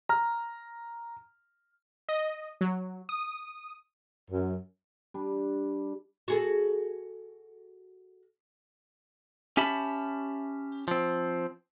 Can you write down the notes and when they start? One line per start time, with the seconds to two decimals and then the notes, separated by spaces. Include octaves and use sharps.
0.09 A#5 F6
2.09 D#5
2.61 F#3
3.09 D#6
4.31 F#2
5.14 G3 D4
6.28 F#4 G#4 A4
9.57 C#4 G4 E5 A5 B5
10.88 F3 C4